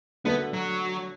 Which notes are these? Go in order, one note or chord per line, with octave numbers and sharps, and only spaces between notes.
D3 A3 B3 D4 F#4
F#3